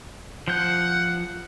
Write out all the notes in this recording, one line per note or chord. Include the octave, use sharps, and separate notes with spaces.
F3 F#5 G6